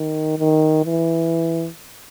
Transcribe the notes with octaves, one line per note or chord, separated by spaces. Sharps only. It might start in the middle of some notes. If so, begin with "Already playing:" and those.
Already playing: D#3
D#3
E3